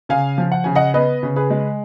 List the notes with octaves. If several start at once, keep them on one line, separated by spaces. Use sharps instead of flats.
C#3 F5 G#5
F3
F#5
C#3 G#5
D#5 F#5
B3 B4 D#5
C#3
G#4 B4
G#3